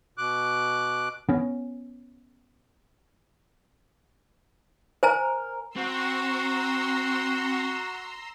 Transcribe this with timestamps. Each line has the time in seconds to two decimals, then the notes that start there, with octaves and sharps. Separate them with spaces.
0.18 B2 D6 F#6
1.29 B3 C#4
5.03 A#4 C5 G#5 A#5
5.76 C4 F#4 A#5 C6 E6